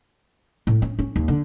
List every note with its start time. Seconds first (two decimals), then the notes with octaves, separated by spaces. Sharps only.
0.67 A2
0.82 C#4
0.99 C#4
1.16 D#2
1.28 D3